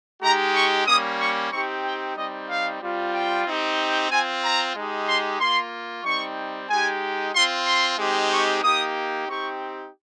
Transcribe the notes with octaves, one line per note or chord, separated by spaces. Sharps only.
G#3 D#4 G4 A#5
C#6
G3 A#3 C#4 D#6
C#6
C4 D#4 G4 C#6
G5
G3 C4 D#4 D#5
F5
G3 C4 F4
G5
C4 D#4 G4
C4 F4 G#5
A#5
G#3 D#4 G4
C6
A#3 F4 C6
G3 C4 D#4 C#6
G#3 D#4 G4 G#5
C4 F4 C6
C6
G#3 C4 D#4 G4
C#6
A#3 D#4 G4 D#6
C4 D#4 G4 C#6